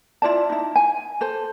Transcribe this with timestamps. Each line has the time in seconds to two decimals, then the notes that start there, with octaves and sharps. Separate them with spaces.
0.22 E4 F4 D5 A5
0.50 D#4 E4
0.76 G#5
1.21 A4 C5